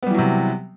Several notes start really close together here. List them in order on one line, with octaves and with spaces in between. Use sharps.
B3 G3 E3 F#3 C3